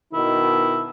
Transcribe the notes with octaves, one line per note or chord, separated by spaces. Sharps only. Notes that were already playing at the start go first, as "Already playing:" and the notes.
B2 D#3 E4